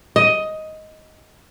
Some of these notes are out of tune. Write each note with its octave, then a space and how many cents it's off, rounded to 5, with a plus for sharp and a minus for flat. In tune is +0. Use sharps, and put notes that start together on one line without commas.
D#5 +10